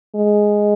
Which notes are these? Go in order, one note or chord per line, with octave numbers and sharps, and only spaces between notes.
G#3